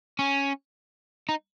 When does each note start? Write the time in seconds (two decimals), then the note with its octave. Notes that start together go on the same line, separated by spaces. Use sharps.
0.19 C#4
1.29 D#4